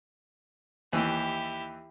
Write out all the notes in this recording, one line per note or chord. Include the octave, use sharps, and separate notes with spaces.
D#2 E3 E4 G4